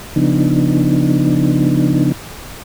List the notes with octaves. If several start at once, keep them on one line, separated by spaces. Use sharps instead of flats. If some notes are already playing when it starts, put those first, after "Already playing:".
C#3 F3 B3 D4 D#4